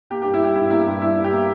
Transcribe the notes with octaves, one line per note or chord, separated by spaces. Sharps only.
A#3 G4
G2 G4
E4
G3 G4
G2 E4
A#3 E4
G4
G2
G3 E4
G2
G4
A#3